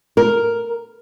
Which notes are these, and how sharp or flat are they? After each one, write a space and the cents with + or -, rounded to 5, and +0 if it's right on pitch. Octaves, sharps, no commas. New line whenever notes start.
A#4 +0